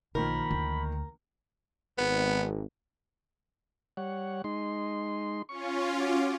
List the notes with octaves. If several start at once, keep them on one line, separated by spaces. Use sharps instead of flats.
B1 D#3 F3 A#3 A#4 B5
D2
G#1 B3
G3 C#5 F#5
G#3 D#4 C6
C#4 F4 C#6
F#4 D6